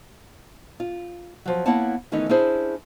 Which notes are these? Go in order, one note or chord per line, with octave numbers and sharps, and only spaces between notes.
F4
F3 F#3
A#3 B3 E4 C#5 F#5 A5
D#3 E3 A3 B3 C#4 D#4
C#4 D4 E4 G#4 C5